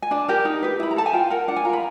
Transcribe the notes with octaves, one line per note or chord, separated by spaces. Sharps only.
G#5
D4 A5
G4 A#4
D#4
G4 B4
E4 B5
A#5
A4 A5
G#5
F4 G5
A#4 F#5
D4 F#5
G#5
F4 A#4 A#5 B5